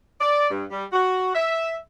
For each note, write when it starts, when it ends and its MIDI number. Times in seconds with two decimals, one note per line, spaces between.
0.21 0.50 74
0.51 0.65 43
0.71 0.85 55
0.93 1.31 66
1.35 1.75 76